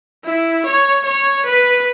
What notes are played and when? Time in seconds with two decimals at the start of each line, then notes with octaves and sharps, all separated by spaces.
0.24 E4
0.66 C#5
1.05 C#5
1.46 B4